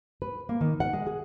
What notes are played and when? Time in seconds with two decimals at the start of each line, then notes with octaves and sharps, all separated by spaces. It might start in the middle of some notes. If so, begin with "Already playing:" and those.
0.22 B4
0.49 A#3
0.61 D#3
0.80 F#5
0.93 G#3
1.07 G#4